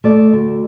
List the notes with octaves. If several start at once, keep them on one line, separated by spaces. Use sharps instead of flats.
A3 D5
D2